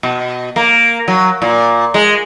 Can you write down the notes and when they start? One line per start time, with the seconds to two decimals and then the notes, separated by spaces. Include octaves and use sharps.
0.03 B2
0.56 A#3
1.08 F#3
1.42 A#2
1.94 G#3